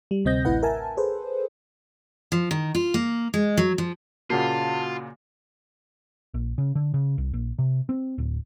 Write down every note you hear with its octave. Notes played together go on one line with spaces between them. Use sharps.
G3
D2 C3 C4 D#5 G6 A#6
A1 A2 E4 B4 F#5
A#4 E5 G#5 A5
G#4 A4 B4 C5
F3
D#3
F4
A#3
G#3
F#3
F3
A#2 C#3 A#3 F4 F#4 F#5 A5
A#1
C#3
D3
C#3
C2
A#1
C3
C4
D1